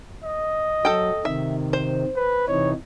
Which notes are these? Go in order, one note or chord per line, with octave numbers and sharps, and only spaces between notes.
D#5
F#3 A4 G5
C3 D#3 E5
C5
B4
C3 E3 D#4 C#5